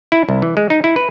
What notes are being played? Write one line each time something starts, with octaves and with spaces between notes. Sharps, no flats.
E4
C2
E3
G#3
D#4
E4
B4